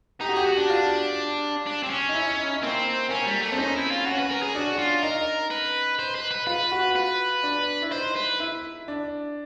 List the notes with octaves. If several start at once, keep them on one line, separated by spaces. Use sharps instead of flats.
D#4 G4
F#4
G4 G#4
F#4
D4
F4
D4
C4
C#4
D#4
E4
D#4
A#3 C4
A#3 C#4
G3
A3
C4 D4
C#4 D#4
E4
F4
C#4 F#4
B4
A#4
G#4
D4 F#4
F4
D#4 A#4
B4
C5
B4
B4
F4 B4
F#4
F4 B4
D4
E4
D#4 C5
B4
E4
D4